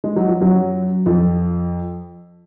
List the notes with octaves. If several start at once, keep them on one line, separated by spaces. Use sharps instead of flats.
G#3
F#3
F3
F#2 F#3
F2 F3